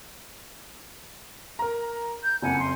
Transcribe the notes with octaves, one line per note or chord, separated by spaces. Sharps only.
A#4 A#5
G6
F#1 F2 F#5 G#5
C6